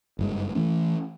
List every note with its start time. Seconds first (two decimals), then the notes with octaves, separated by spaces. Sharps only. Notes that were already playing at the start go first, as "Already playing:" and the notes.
0.19 F#1 G2 G#3
0.55 E3 A3 C#4